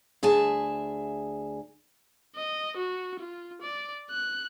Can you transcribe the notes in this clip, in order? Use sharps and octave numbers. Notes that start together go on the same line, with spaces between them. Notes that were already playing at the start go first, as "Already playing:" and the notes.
D2 G#4 E5 G#5 A5
D#5
F#4
F4
D5
F#6